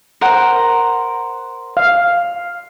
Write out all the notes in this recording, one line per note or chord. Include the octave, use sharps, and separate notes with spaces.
A#4 C5 F#5
F5